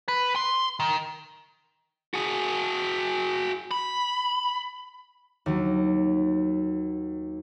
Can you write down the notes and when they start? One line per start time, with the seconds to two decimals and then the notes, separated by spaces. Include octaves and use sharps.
0.08 B4
0.36 C6
0.80 D#3
2.14 F#4 G#4
3.71 B5
5.46 D#2 F#3